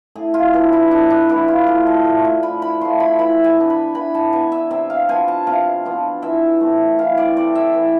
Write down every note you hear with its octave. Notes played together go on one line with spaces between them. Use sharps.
A2 G#4
F4
E3 B3 D4 G#4
E4
A2 D4
D4
E3 B3 D4 E4
F4
A2 G#4
A4
F3 A3
G#5
A2 B5
B5
F3 A3 C6
B5
E3 B5
G#5
B3 D4
B5
E3 B5
A5
B3 D4 G#5
E5
C3 E5
F5
F3 B3 D4 G#5
A5
C3 F5
F3 B3 D4
E3 E5
A3 C4
E3 F5
D5
A3 C4 D5
E5
E3